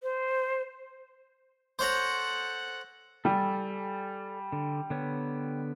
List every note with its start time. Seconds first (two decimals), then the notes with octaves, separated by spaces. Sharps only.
0.03 C5
1.79 A4 C5 C#5 F#5 A#5
3.25 G3 A4 D5 G#5
4.52 D3
4.90 D3 B3 C#5